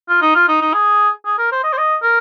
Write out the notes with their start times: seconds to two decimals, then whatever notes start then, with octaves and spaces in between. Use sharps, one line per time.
0.09 F4
0.21 D#4
0.35 F4
0.48 D#4
0.61 D#4
0.73 G#4
1.25 G#4
1.38 A#4
1.52 C5
1.64 D#5
1.73 C5
1.78 D#5
2.03 A#4